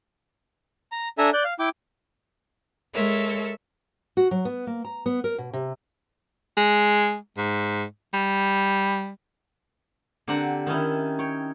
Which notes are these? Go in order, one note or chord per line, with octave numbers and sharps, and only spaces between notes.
A#5
D4 A4 E5 G#5 A#5
D5 F#6 G6
F5
E4 G5 D6
G#3 A4 A#4 C#5 E5
F#4
F#3
B3
A#3
A#5
B3
A#4
B2
C3
G#3
G#2
G3
D3 C4 G4 F#5 A#5
D#3 C#4 D#4 E4
C#5 G5